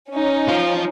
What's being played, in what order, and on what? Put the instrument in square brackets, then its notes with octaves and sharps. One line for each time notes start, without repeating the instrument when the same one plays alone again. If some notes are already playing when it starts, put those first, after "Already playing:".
[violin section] C#4 D#4
[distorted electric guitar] F4 C5